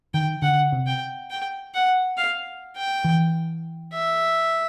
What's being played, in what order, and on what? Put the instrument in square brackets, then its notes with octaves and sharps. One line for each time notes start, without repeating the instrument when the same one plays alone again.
[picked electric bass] D#3 [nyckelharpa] G5
[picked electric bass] D3 [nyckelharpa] F#5
[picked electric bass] C3
[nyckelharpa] G5
G5
F#5
F5
G5
[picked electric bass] E3
[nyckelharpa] E5